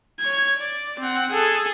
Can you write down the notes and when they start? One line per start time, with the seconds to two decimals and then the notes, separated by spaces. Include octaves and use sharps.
0.20 C#5 G#6
0.58 D5
0.99 C4 F#5
1.31 G#4 A4